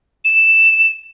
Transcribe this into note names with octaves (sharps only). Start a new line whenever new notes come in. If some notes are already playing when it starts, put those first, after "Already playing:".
E7